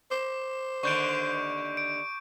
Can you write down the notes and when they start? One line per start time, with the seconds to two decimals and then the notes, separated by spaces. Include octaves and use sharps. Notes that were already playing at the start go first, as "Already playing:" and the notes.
0.11 C5 D6
0.83 D#2 D3 C#6 G6 D7
1.77 D7